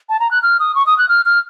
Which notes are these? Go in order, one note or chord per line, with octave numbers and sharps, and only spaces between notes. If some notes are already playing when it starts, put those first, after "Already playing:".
A5
A#5
F#6
F6
D#6
C#6
D#6
F#6
F6
F6